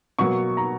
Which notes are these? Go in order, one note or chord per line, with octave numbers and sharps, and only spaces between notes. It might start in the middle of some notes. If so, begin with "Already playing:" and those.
B2 F#3 A#3 C#6
A#5